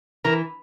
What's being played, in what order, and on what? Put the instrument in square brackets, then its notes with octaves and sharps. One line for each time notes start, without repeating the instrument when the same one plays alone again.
[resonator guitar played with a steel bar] E3 [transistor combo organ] A#4